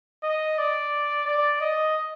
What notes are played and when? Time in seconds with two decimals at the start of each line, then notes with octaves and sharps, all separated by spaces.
0.24 D#5
0.58 D5
1.28 D5
1.61 D#5